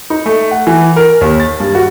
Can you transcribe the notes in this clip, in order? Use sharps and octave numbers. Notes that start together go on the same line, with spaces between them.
D#4
A3
F#5
E3
A#4
D#2
A6
G2
F#4